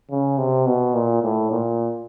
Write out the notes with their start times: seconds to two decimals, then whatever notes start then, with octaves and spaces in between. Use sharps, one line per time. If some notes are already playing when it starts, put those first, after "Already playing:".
0.11 C#3
0.38 C3
0.67 B2
0.94 A#2
1.23 A2
1.51 A#2